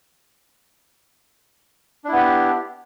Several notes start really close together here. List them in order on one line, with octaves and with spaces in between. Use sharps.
D4 E4 B3 G4